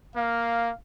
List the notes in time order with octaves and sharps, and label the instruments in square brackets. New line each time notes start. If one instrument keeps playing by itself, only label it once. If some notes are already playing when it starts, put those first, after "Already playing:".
[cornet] A#3 [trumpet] F5